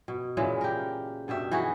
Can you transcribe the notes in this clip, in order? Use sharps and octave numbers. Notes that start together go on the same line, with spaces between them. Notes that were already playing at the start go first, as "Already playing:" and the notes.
B2
A#2 C#3 E3 G#3
G4 A#4
G2 B2 G4 E5
E3 D#4 F#4 G#4